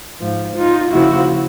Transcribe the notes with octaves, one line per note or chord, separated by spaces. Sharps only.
G#2 F3
D#4 F4
D#2 C#3 F3 E4 F#4